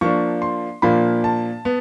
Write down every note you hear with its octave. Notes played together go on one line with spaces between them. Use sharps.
F3 A#3 D4 C#6
C6
A#2 F3 A#3 D4 B5
A5
B3